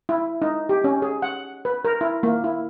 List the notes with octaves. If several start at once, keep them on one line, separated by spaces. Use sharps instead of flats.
E4
D#4
G4
C#4
G#4
F#5
B4
A#4
E4
A#3
E4